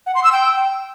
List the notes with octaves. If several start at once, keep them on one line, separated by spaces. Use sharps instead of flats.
F#5
C6
E6
G5